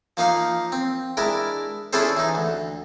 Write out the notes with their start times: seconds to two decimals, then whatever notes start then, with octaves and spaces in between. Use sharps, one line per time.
0.17 F3 A#3 D#4 F5
0.72 C4
1.17 G#3 D4 E4 A#4
1.93 C#4 D4 E4 G#4 A4 C5
2.17 E3 D#4
2.35 D2